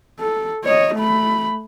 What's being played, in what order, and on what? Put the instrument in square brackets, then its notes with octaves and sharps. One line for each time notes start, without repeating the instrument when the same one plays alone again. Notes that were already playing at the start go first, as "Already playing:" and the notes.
[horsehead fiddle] A4
C#5 D#5
A3 B5